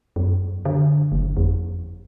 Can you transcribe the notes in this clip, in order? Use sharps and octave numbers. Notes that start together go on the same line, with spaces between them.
F#2
D3
G1
F2